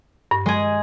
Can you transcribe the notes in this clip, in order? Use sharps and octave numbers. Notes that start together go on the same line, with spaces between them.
G2
G#3 G#4